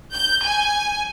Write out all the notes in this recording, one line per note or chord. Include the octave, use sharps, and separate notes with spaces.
G6
G#5